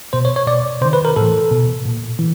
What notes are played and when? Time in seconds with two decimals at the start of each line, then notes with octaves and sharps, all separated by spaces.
0.13 B2 C5
0.25 C#5
0.36 C#5
0.47 B2 D5
0.81 C3 C5
0.85 D#3
0.93 B4
1.05 A#4
1.16 A2 E3 A4
1.51 B2
1.86 A#2
2.19 E3